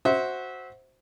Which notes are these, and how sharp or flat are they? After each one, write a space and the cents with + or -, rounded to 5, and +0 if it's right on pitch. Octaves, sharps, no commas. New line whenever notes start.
F#4 +0 C5 +0 E5 -25